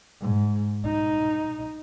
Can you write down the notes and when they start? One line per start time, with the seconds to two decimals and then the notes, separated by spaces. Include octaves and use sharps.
0.21 G#2
0.85 D#4